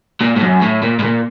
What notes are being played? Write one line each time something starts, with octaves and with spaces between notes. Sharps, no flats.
A#2
A2
F#2
A2
A#2
A2
A#2